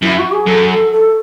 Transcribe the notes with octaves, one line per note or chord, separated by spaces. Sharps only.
F#2 E4
F#4
G#4
F#2 A4
A4
A4